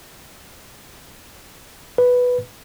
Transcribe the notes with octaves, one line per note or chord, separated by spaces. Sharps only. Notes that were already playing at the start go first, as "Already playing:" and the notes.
B4